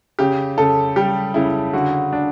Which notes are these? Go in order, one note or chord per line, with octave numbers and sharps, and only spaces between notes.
C#3 G4
C#3 A4
G3 G4
C#3 E4
D3 F#4
D4